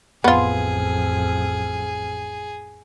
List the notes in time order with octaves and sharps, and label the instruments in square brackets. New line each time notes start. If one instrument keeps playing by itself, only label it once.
[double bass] A1 F2 [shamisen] B3 F4 [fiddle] G#4